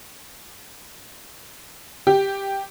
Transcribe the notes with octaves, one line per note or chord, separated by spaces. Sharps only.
G4